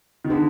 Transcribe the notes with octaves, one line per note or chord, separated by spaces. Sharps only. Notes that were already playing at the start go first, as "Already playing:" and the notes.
D#3
D3 B3 D#4 G#4 B4